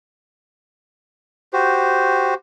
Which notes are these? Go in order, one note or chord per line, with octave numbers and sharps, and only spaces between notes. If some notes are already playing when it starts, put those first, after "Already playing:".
F#4 G4 C5